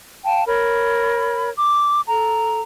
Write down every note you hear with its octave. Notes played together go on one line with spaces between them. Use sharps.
F5 G5 A5
A#4 C#5 B5
D6
A4 A#5